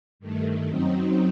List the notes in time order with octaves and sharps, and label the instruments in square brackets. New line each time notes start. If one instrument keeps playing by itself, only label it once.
[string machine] G2 D#3 A3
F#2 F#3 C4 D#4